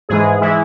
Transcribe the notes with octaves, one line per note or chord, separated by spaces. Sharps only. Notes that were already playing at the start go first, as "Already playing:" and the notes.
G#2 E3 G#3 G#4
E3 G#3 E4